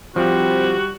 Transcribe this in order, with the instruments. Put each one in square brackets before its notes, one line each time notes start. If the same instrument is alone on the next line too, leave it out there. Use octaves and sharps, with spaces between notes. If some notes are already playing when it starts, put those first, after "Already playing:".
[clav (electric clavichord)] F3 [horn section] G3 [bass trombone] C4 [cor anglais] F#4